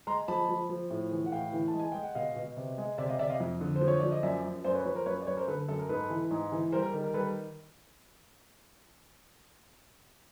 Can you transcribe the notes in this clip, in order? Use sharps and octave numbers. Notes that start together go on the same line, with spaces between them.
G#3 A#5 C6
F3 A5 B5
F3
F3
A2
E3
F#5
A2 F5 G5
E3
A5
G#3
G#5
G#3 G5
F#5
B2 D#5 F5
B2
C3
G#3
C3 D5 E5
D#5 F5
C3 D5 E5
D#5 F5
F2
D3
C5
F3
C#5
F3 D5
D#5
F#2 D5 E5
F#2
F#2 C5 D5
B4 C#5
F3 B4 C#5
A#4 C5
F#2 B4 C#5
D5
F#2 B4 C#5
A#4 C5
D3 A4 B4
F#2 A4
A#4
G#2 A4 B4
E3
G#2
E3
G3 A#4 C5
A#4
D#3
A#4
G3 A4 B4